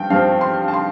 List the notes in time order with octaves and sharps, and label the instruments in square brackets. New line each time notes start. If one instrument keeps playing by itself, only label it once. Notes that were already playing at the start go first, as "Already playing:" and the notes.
Already playing: [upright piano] G2 F3 G5
G2 F3 C4 F5
C6
A5
C6